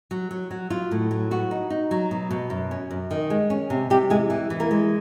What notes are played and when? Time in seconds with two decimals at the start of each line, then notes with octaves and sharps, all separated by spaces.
0.11 F#3
0.31 F#3
0.51 F#3
0.70 F#3 F4
0.91 A2
1.11 F#3
1.31 B3 F#4
1.51 D#4
1.70 D#4
1.91 F#3
2.11 B2
2.31 B2
2.50 F#2
2.71 C#4
2.91 F#2
3.11 D#3
3.30 G#3
3.50 C#4
3.70 C3
3.90 C3 G3 G4
4.10 E2 G#3 G#4
4.30 E3
4.50 E3
4.60 A#3 A#4
4.71 G#3